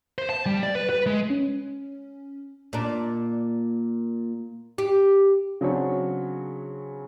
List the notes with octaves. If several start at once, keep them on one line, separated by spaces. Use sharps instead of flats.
C5
A5
G3
D5
B4
B4
G#3
C#4
A#2 D4
G4
C#3 F#3 C4 D4 F#4 C#5